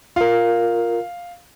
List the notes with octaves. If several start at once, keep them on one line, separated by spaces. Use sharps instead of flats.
F4 A#4 F5